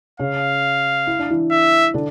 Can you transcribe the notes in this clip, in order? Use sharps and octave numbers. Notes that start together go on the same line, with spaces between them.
C#3 C#4 F5
E4
D4
E3 E4
E5
D3 D4